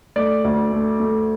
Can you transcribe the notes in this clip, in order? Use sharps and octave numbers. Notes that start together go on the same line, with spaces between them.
A3 D5
D2
A3
A3